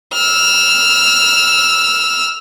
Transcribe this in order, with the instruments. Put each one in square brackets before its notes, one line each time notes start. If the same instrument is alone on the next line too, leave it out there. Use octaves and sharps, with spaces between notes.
[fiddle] E6 F6